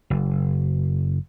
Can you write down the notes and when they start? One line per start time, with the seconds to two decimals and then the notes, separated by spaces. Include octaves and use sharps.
0.10 F#1